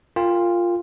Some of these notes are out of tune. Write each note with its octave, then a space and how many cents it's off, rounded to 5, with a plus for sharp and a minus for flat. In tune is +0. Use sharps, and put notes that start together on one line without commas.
F4 +0 A#4 -30 G5 +35